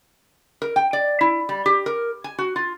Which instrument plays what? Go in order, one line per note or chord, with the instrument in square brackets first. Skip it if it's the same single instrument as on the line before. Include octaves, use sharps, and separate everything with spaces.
[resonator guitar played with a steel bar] A#4
G5
D5
E4
G3
G4
A#4
G#5
F#4
F4